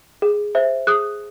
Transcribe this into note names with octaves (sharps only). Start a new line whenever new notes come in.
G#4
C5 E5
G#4 D#6 F#6